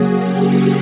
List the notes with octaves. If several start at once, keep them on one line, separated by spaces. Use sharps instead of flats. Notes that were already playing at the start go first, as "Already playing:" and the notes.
Already playing: C#3 F#3 A#3 F#4 G#4
G4